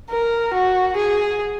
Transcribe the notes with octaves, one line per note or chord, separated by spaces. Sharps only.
A#4
F#4
G#4